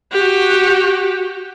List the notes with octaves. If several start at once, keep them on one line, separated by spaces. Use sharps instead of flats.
F#4 G4